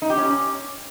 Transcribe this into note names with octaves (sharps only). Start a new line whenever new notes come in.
D#4
G4
C#4